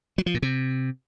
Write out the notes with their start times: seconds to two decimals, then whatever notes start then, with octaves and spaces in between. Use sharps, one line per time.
0.18 F#3
0.26 F3
0.34 A#2
0.42 C3